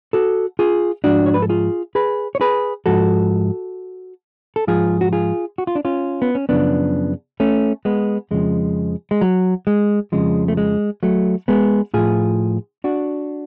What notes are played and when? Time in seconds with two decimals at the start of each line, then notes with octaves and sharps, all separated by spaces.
0.13 F#4 A4
0.59 F4 G#4
1.04 G#2 F3 D4 F#4
1.26 C#5
1.34 B4
1.42 A4
1.49 F4 G#4
1.95 G#4 B4
2.35 C#5
2.41 G#4 B4
2.86 G#2 F3 F#4 A4
4.56 A4
4.67 G#2 F3 F4 G#4
5.01 F#4
5.13 F4 G#4
5.58 F#4
5.67 F4
5.75 D4
5.85 C#4 F4
6.22 B3
6.35 C#4
6.49 F#2 C#3 F3 B3 D4
7.40 A3 C#4
7.85 G#3 B3
8.31 F2 C#3 F3 G#3
9.11 G#3
9.21 F#3
9.67 G#3
10.12 F2 C#3 F3 G#3
10.48 A3
10.57 G#3
11.03 F#3 A3
11.48 G#3 B3
11.94 A2 F3 F4 G#4
12.84 D4 F#4